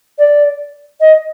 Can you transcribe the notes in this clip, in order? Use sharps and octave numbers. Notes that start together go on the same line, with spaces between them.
D5
D#5